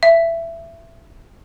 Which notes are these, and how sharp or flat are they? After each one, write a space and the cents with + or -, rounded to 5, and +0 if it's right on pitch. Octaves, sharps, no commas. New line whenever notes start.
E5 +20